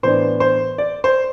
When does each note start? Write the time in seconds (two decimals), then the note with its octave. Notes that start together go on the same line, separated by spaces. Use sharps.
0.03 A2 E3 B3 D4 C5
0.40 C5
0.78 D5
1.04 C5